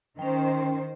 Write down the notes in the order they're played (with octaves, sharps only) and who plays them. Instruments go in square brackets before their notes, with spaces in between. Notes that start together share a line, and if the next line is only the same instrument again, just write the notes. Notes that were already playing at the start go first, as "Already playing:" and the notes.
[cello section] D#3 C5 [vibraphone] C#4 G5